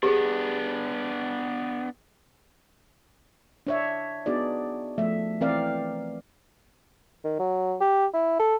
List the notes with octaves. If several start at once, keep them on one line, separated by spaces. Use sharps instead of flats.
B3 D4 G4 G#4
D4 C#5 E5
B3 D4 D#4 F#4 G#4 D5
F3 A3 E5
E3 C4 A#4 D5 F5
D#3
F#3
G4
E4
A4